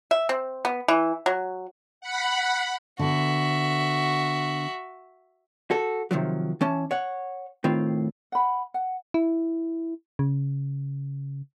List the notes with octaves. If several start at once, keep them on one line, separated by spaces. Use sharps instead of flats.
E5
C4
B3
E3
F#3
F#5 B5
D3 B3 F#4 E5
F#4 A4
C3 D#3 F3 F#3
E3 C#4 A5
C#5 F#5
A2 D#3 C4 F4
F#5 B5
F#5
E4
C#3